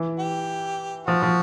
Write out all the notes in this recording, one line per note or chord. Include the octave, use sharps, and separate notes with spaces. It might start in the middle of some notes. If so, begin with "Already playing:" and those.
Already playing: E3
G4
F3 F#4
F3